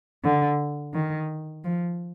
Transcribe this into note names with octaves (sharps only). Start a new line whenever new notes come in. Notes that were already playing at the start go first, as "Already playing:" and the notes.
D3
D#3
F3